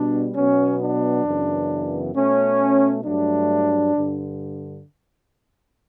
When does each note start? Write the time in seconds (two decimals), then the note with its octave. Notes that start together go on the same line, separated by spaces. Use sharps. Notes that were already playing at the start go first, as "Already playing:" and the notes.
Already playing: B2 G3 B3 D4
0.35 B2 F#3 B3 C#4
0.80 D4
1.25 F#2 C#3 E3 B3
2.14 B2 A3 C#4
3.03 G2 F#3 A3 D4
3.94 G2 D3